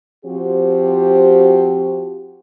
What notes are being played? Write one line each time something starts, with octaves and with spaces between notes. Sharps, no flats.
F3 C4 F#4 G4